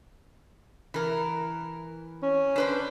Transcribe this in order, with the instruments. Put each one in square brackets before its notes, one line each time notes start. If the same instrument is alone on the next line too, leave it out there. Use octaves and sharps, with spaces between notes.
[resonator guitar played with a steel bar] E3 A#4
[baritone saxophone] C#4
[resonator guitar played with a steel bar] D4 B4 C5